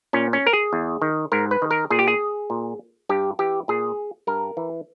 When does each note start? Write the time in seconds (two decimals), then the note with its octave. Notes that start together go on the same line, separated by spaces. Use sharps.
0.13 A#2 C#4
0.33 C#4
0.46 A#4
0.53 G#4
0.73 E2
1.02 D#3
1.32 G#2 A#4
1.51 B4
1.62 D#3
1.71 A#4
1.90 A#2 G#4
1.99 G4
2.08 G#4
2.50 A#2
3.09 G2 G4
3.39 E3 G4
3.68 A#2 G#4
4.27 G2 A#4
4.57 E3